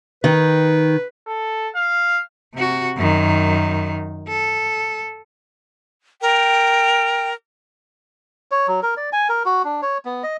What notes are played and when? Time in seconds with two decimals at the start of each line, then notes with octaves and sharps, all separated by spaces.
0.24 D#3 B4
1.27 A4
1.75 F5
2.54 C3 F#4
2.97 F#2 D#3
4.28 A4
6.22 A#4 G5
8.51 C#5
8.68 F#3
8.83 A#4
8.97 D5
9.13 G#5
9.29 A#4
9.45 F#4
9.65 D4
9.82 C#5
10.05 B3
10.23 D#5